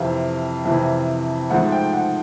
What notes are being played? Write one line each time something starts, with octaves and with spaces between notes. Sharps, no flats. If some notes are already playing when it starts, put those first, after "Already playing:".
Already playing: F2 C3 E3 F5
F2 C3 E3
G#2 F3 A3 F#5
G5
F#5